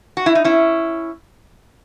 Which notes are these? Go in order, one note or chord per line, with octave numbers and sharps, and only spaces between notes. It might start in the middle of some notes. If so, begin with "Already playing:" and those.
F#4
E4
D#4
C#4 E4